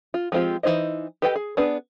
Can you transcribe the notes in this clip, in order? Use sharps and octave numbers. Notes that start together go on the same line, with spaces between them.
F4
F3 G#3 C4 F4 G4
E3 A#3 D#4 C5 D#5
G4 A4 B4 D#5 G5
G#4
B3 D4 G#4 B4